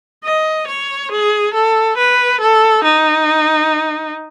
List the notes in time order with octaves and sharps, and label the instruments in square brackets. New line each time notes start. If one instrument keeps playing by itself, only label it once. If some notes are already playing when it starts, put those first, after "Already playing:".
[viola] D#5
C#5
G#4
A4
B4
A4
D#4